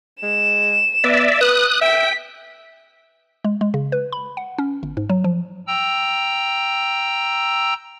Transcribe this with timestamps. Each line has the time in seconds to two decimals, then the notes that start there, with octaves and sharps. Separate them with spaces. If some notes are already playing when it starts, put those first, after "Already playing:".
0.23 G#3 E7
1.04 B3 D5 E5
1.41 B4 D#6 F#6
1.81 E5 G5 B6
3.44 G#3
3.61 G#3
3.74 C#3
3.92 B4
4.12 B5
4.37 F#5
4.58 C#4
4.83 G1
4.97 G#2
5.09 F#3
5.24 F3
5.67 G5 A#5 E6